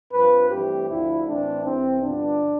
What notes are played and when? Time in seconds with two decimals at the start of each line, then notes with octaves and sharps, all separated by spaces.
0.13 G2 F3 C4 B4
0.50 G2 E3 A3 C4 G4
0.89 D2 D3 F3 E4
1.27 A2 E3 A3 C4 D4
1.64 C2 C3 E3 C4
2.02 G2 D3 F3 B3 D4